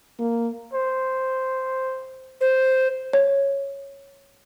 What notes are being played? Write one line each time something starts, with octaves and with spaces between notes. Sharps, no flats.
A#3
C5
C5
C#5